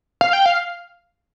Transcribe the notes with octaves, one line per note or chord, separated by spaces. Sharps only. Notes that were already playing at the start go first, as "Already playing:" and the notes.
F5
G5
F5